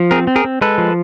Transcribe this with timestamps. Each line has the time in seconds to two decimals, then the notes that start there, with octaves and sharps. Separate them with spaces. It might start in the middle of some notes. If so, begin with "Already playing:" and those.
Already playing: F3
0.11 C4 G#4 A#4
0.27 C4
0.36 G#4 A#4
0.45 C4
0.61 G#3 A4 B4
0.78 F3